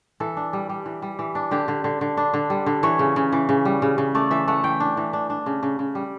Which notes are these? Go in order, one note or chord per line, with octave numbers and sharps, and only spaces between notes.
E3 A4
D4
G3
G3
E3
G3
E3
D4
D3 G4
D3
D3
D3
D4
D3
G3
D3
E3 C#5
C#3
C#3
E3
C#3
G3
C#3
C#3
A3 D5
E3 E5
A3 F#5
E3 G5
D4
E3
D4
D4
C#3
C#3
C#3
G3